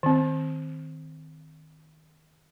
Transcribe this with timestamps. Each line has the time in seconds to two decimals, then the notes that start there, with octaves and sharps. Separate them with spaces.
0.03 D#3 C4